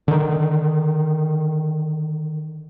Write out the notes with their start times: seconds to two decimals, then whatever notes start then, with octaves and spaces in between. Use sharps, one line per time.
0.08 D3 D#3